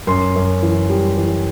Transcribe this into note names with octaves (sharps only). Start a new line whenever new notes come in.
F#2 C6
F#2
E3
G3
E3